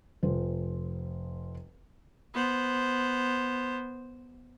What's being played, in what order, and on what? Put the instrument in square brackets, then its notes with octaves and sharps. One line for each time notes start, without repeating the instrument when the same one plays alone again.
[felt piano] F1 F4 C5
[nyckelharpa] B3 C5